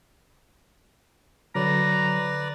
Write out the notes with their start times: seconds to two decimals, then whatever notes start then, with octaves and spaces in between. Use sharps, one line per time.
1.55 D3 F#3 B4 D5 A#5